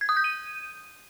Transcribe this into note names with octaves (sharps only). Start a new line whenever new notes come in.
G#6
D#6
G6
D#7